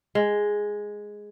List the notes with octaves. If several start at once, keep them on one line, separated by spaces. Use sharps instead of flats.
G#3